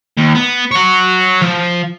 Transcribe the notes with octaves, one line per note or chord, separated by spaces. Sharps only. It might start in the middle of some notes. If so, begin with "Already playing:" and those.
D#2
B3
C#5 F#5
F3